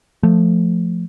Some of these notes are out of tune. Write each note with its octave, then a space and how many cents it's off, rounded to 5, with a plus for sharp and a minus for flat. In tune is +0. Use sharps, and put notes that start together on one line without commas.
F3 +0 A3 +0